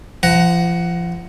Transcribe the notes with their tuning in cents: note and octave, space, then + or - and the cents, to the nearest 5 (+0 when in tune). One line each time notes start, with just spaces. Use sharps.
F3 -30 F#5 +10 A#5 +10